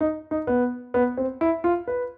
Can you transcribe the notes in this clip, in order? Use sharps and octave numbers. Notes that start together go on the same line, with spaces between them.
D#4
D#4
B3
B3
C4
E4
F4
B4